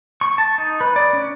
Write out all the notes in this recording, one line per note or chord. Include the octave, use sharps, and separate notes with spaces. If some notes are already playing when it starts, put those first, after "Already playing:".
C#6
A5
D#4
B4
D5
C#4